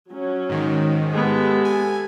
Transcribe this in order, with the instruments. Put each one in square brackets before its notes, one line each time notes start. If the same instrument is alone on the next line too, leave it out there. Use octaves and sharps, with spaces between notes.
[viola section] F#3 C#4
[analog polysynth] G#2 D#3
[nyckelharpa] G#3 B3 [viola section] G4 A4
[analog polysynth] G#5